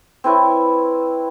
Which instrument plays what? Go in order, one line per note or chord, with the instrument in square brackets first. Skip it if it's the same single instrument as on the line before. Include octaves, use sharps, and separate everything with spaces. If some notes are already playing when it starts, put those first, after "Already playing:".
[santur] C4 E4 B4 C#5